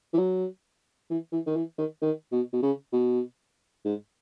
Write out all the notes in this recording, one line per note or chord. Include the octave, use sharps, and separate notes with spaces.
E3
F#3
E3
E3
D#3
E3
D#3
D#3
B2
B2
C#3
B2
G#2